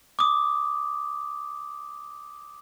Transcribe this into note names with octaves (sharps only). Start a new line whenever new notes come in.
D6 D#6